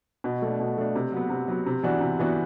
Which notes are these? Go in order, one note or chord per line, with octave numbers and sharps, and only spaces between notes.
B2
A3 D4
B2
A3 D4
C3
F#3 B3
C3
F#3 B3
C3
E3 B3 D4 F#4
C3
E3 B3 D4 F#4